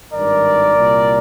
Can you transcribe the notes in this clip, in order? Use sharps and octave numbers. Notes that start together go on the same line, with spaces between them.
G#1 G2 D#3 A#4 D5
C2 A#2